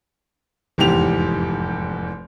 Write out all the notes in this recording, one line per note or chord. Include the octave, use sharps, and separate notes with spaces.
F1 E2 G#2 G4 F7